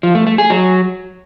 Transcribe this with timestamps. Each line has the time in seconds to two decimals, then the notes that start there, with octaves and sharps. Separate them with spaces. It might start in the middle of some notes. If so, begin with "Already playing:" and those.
0.03 F3
0.15 A3
0.27 A3
0.38 G#4
0.50 F#3